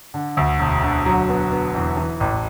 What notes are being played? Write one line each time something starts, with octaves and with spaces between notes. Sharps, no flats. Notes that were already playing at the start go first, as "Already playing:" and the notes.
D3
D2
E1
D3
F#3
B3
B3
E2
E3
A1